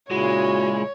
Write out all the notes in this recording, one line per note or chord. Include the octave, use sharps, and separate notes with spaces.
A#2 C#3 G#3 E4 F#4 C#5